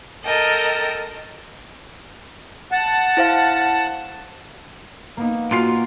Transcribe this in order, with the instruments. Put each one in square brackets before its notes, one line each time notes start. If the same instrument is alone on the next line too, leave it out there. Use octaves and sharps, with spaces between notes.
[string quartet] A4 A#4 D#5 G5
[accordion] F#5 A5
[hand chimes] E4 C5 F5
[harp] A#3 B3 D#4
[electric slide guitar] A#2 F4 F5 [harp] F#4